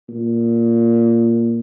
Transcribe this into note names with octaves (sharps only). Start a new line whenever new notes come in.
A#2